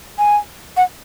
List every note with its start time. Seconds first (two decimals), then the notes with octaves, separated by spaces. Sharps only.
0.18 G#5
0.77 F#5